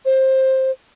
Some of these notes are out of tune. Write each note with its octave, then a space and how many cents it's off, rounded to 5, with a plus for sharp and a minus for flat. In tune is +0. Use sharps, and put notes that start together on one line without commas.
C5 +15